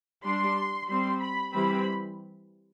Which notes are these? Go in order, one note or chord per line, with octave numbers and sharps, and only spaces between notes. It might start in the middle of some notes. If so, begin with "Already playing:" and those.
G3 D4 C6
G3 C4 C6
B5
E3 G3 C4 B5